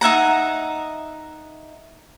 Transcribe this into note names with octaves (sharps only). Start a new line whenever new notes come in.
D#4 E5 F#5 A#5